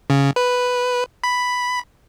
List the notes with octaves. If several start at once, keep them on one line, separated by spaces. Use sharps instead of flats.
C#3
B4
B5